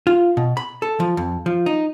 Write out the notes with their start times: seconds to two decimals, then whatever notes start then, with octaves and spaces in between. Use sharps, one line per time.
0.07 F4
0.37 B2
0.57 B5
0.82 A4
1.00 F3
1.17 F2
1.46 F3
1.66 D#4